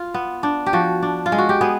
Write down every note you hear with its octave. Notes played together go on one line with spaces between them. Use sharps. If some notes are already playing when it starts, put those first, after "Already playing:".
Already playing: F4
B3
D4
G4
F3 F#4
D4
F4
G#3
F#4
G4
B3 G#4